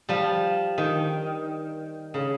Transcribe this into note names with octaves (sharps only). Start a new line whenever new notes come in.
F3 G3
D#3
C#3